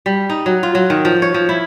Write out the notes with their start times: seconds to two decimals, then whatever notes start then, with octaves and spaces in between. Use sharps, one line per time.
0.06 G3
0.30 D#4
0.46 F#3
0.63 F4
0.75 F#3
0.90 D#3
1.05 F3
1.22 C#5
1.34 F3
1.49 E4